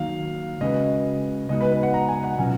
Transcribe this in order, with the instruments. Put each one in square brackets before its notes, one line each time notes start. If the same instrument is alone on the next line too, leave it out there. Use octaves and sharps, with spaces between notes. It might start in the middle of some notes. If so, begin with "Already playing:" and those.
Already playing: [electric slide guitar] D#3 F#3 A#3 D#4 F#4 [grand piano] F5
[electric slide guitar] C#3 G#3 C#4 F#4 B4 [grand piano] D#5
[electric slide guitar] C#3 G#3 B3 D#4 F#4 [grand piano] D#5
[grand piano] B4
B4
F#5
A#5
G#5
F#5
[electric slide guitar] B2 F#3 C#4 F4 [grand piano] G#5